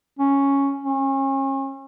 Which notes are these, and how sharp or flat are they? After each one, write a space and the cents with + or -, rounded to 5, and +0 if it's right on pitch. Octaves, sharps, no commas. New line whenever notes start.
C#4 +0
C#4 -35